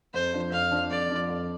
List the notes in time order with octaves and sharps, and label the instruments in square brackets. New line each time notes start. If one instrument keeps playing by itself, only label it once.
[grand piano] F2 [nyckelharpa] C5
[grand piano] F3 D4 F4
[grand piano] F2 [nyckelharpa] F5
[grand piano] F3 D4 F4
[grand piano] F2 [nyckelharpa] D5
[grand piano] F3 D4 F4
F2